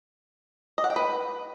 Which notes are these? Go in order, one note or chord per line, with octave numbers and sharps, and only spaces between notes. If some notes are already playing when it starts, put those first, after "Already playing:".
D#5
F#5
G5
B4